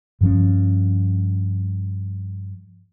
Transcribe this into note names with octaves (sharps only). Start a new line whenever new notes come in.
G2 F3 C#4